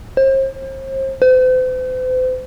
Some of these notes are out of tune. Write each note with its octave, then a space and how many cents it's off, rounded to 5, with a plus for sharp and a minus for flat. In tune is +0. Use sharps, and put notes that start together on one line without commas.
C5 +35
C5 -40